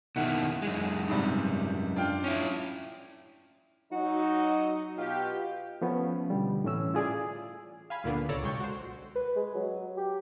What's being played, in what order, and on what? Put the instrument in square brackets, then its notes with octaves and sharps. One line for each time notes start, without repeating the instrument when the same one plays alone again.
[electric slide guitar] B2 D#3 A#3 [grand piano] E4 F#5
[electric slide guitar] F#2 G#3
[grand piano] G#2 C3 G3
D4 F4 G5
[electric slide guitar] C#4 E4
[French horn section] F#3 D#4 [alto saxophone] F#4
[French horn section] B2 G4 [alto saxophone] F4
[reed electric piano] F3 A3 B3 C#4
B2 D3 G3
A2 E3 C#4 E6
E4 F4 G#4 D5
[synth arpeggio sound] F5 G#5 B5
D2 A#2 D3 A#3 B3 D4
C#2 A4 C#5 D5 A5 A#5
B1 G#3 G5 C#6 G6
F#4 C5
[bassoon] B4
G#3
F#3
G4